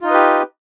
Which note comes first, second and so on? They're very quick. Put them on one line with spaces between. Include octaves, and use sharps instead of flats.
F4 D#4 D#5 B4 G4